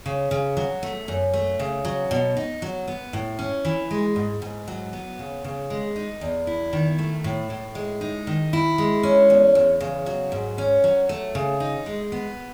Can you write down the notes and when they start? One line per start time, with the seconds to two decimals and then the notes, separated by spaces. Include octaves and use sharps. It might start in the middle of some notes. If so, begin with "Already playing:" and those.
0.06 C#3
0.31 C#3
0.57 F#3
0.83 A3
1.08 F#2
1.34 A3
1.59 C#3
1.85 F#3
2.11 B2
2.37 D#4
2.62 F#3
2.88 B3
3.13 A2
3.39 C#4
3.65 E3
3.91 G#3
4.16 G#2
4.42 G#2
4.68 F#3
4.93 B3
5.19 C#3
5.44 C#3
5.70 G#3
5.96 D#4
6.21 E2
6.47 E4
6.73 D#3
6.98 A3
7.24 A2
7.50 A2
7.75 G#3
8.01 D#4
8.27 D#3
8.53 E4
8.78 G#3
9.03 C#4
9.30 E2
9.55 E2
9.81 C#3
10.06 F#3
10.32 G#2
10.58 C#4
10.84 F#3
11.09 A3
11.35 C#3
11.60 D#4
11.86 G#3
12.12 B3